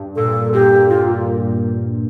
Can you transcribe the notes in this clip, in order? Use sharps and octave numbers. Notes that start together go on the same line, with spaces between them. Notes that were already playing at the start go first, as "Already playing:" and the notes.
Already playing: G2
A#2 A4
A#2 G4
A#2 F4